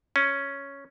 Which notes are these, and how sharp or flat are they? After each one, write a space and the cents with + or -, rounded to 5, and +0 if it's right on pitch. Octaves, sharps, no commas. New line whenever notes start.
C#4 +0